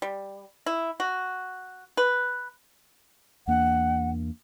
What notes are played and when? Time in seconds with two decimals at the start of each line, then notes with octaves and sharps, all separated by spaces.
0.02 G3
0.66 E4
1.00 F#4
1.97 B4
3.48 E2 A#3 D4 F#5